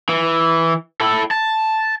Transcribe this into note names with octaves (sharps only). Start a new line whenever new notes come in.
E3
E4 A4
A5